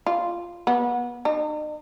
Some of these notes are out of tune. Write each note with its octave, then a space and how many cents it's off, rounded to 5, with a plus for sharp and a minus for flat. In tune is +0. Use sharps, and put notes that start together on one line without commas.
F4 -5
B3 -30
D#4 -40